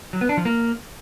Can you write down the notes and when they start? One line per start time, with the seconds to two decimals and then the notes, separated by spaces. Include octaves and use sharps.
0.13 F#3
0.21 B3
0.29 D4
0.37 F3
0.45 A#3